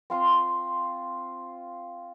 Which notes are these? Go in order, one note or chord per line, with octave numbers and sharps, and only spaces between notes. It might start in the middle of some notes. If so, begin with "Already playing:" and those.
C4 F4 C6